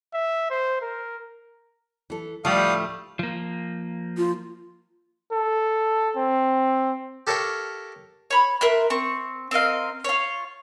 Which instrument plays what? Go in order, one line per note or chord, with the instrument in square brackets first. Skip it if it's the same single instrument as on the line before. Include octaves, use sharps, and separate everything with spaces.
[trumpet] E5
C5
A#4
[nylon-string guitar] E3 A4
[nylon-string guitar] D2 A2 F3 [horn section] G3 [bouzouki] A3 [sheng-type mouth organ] F5 D#6
[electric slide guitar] F3 A#3
[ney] F4
[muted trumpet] A4
C4
[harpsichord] G4 A4 A#4 C#5 F5 G5
[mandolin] C#5 B5
A#4 E5 C6 F#6
C4 C#6
C4 A#4 D#5 F5
F4 C#5